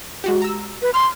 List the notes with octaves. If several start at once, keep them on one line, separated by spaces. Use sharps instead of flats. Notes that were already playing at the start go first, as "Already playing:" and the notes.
G#3 F#4 G4
A#5 E6
B4
C6 F6